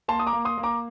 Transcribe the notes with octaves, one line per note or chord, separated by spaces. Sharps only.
A#3 A5 C6
D#6
A#5 D6
A#3
C6 D#6
A#3
A#5 D6